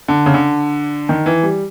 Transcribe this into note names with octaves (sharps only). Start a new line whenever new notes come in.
D3
C#3
D3
D#3
E3
G3